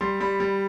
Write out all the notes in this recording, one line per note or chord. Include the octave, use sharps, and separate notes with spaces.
G3 C6
G3 B5
G3